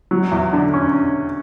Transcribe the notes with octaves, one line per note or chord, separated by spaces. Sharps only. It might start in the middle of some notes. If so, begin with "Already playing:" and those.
F#3
E2
D3
C#4